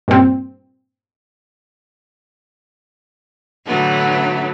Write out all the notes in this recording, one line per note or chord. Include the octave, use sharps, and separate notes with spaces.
G2 A#2 C4
A2 D3 E3 F#3 A3 B3